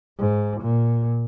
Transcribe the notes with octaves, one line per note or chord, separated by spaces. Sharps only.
G#2
A#2